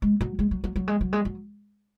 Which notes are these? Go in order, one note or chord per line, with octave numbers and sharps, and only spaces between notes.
G#3
F#3
G#3
F#3
F#3
F#3
G#3
F#3
G#3
F#3